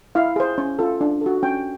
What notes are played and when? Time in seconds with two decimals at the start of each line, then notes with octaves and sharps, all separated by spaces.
0.15 E4 F5
0.36 G#4 C5
0.58 C#4
0.79 F4 A4
1.01 D4
1.21 F#4 A4
1.43 C#4 G5